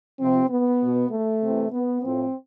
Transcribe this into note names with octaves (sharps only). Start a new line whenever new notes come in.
C3 F3 C4
B3
B2
A3
C3 E3
B3
A2 F3 C4